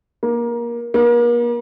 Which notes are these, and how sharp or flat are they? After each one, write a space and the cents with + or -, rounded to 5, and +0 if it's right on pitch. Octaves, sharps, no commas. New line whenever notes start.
A#3 +20
A#3 +40